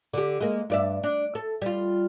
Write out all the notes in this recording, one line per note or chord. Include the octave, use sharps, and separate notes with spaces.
D3 G4
G#3 A#3
G2 D5 E5
D4
A4
G3 F4